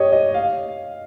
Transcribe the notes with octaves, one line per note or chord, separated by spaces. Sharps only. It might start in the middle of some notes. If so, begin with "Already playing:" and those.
Already playing: G4 C#5 D#5
D#5
F5